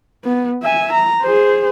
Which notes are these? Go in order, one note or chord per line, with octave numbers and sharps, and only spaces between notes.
B3
E5 G#5
A#5
G#4 C5